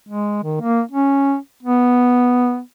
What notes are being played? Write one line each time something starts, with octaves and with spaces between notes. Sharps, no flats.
G#3
D#3
A#3
C#4
B3